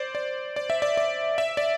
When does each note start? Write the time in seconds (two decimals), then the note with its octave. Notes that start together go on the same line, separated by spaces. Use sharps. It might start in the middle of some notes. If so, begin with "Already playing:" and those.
Already playing: C5 D5
0.15 D5
0.56 D5
0.70 E5
0.82 D5
0.97 D5
1.38 E5
1.57 D5